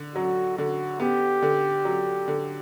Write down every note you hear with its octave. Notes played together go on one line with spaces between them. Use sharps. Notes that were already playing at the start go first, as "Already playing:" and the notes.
Already playing: D3
F#3 F#4
D3 F#4
B3 G4
D3
F#3
D3